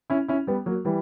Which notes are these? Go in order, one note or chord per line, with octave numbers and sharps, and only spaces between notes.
C#4 E4
C#4 E4
G3 B3
F#3 A#3
E3 G3